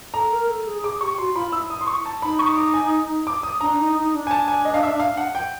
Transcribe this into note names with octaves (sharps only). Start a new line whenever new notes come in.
A4 A#5
A#4
A4
G#4
G#4 D6
G4 C#6
F#4 C6
F4 B5
E4 E6
D#6
C6
C#6
A5
D#4 B5
C#6
D6
G#5
D6
D#6
D4 A#5
D#4
D#4
D4
G#5
A5
G#5
D#5
F5
E5
F5
F#5
G5